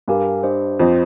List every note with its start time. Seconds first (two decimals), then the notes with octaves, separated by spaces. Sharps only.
0.08 G2 G4 A#4 F5 G#5
0.43 D4 G4 C5 D#5
0.80 F2 C4 F4 C5 D#5